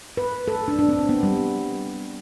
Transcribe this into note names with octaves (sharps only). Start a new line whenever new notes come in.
B4
A4
D4
D4
C4
C4
B3
G3